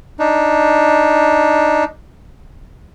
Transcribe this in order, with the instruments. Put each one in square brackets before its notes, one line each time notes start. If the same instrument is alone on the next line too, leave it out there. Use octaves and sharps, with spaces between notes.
[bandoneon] D4 D#4